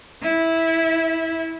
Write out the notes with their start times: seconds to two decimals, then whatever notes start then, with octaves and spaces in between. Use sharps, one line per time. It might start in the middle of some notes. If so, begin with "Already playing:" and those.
0.23 E4